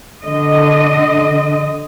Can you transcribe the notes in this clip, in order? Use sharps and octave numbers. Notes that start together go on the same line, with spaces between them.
D3 D#5